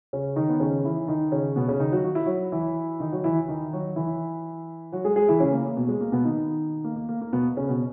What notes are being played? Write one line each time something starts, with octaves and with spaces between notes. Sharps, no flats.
C#3 C#4
D#3 D#4
B3
C#3 C#4
E3 E4
D#3 D#4
C#3 C#4
B2 B3
C#3 C#4
D#3 D#4
F#3 F#4
F#4
E4
F#3 F#4
E3 E4
D#3 D#4
F#3 F#4
E3 E4
D#3 D#4
F#3 F#4
E3 E4
F#3 F#4
G#3 G#4
G#3 G#4
E3 E4
C#3 C#4
A#3
A#3
B2 B3
G#3
A#3
B2 B3
D#3 D#4
A#3
A#3
A#3
A#3
B2 B3
C#3 C#4
B2 B3